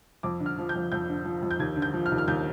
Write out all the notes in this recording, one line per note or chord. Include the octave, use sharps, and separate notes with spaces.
F2 D6
D3
F6
F3
G6
F2
F2 G6
D3
F3
F2
G6
D#2 G#6
D3
G6
F3
F6
D#2
F6
D#2 G6